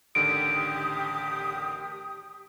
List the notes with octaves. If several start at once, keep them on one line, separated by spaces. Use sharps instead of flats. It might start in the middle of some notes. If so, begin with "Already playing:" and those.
A1 D3 D#3 G4 D#6 D7